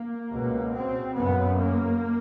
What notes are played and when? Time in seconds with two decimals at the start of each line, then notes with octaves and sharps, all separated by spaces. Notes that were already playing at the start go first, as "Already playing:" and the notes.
Already playing: A#3
0.31 C#2 B2
0.74 C4
1.16 F#2 C#3 B3
1.58 A#3